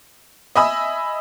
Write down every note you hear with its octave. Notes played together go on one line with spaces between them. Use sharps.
D#5 E5 G#5 B5 D#6 E6